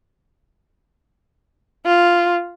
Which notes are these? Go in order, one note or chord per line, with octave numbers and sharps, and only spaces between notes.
F4